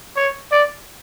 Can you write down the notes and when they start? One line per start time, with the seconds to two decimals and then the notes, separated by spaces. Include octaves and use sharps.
0.16 C#5
0.52 D5